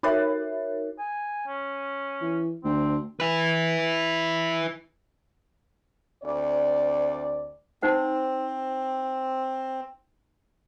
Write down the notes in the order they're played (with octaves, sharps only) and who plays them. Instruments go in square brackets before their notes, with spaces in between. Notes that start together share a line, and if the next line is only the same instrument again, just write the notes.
[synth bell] D#4 F#4 A#4 C#5 E5
[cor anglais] G#5
C#4
[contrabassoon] E3
[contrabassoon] D2 [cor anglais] C4
[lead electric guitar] E4 B4
[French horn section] D2 C4 D5
[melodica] C4 [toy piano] D#4 C5 F#5